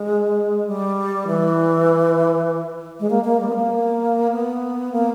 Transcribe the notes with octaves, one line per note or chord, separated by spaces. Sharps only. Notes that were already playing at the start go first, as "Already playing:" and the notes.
Already playing: G#3
G3
E3
G#3
A#3
A#3
G3
B3
A#3
B3
A#3